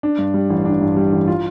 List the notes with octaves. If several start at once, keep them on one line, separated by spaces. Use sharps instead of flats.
D4
G2
G3
A1
D4
G2
G3
A1
F4